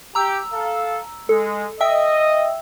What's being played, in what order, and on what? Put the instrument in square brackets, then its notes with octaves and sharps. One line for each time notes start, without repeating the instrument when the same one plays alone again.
[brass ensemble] G4 [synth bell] A#5 E6
[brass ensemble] A4 F5
[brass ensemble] G#3 [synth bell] A4
[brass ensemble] D#5 [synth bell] E5 G5 E6